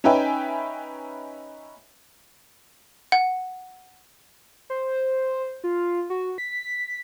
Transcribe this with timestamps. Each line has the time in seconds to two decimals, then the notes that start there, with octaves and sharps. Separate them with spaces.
0.04 C#4 D#4 B4 E5 G5 G#5
3.12 F#5
4.70 C5
5.64 F4
6.10 F#4
6.38 B6